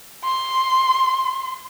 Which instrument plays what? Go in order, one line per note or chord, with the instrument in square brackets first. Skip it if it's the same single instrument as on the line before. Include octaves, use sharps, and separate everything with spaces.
[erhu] C6